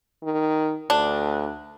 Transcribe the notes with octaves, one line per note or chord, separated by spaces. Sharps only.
D#3
D2 D4